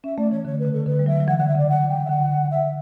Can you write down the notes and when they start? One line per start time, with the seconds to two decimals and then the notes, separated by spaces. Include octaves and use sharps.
0.04 C#4 E5
0.17 A3 D5
0.31 E3 C#5
0.45 D3 C#5
0.59 B4
0.65 C#3
0.73 A4
0.86 D3 B4
0.99 G3
1.06 F#3 E5
1.20 F#3
1.27 E3 F#5
1.38 D3 F#5
1.47 E5
1.55 C#3 D5
1.69 F#5
1.89 G5
2.05 E5
2.09 D3 F#5
2.50 E5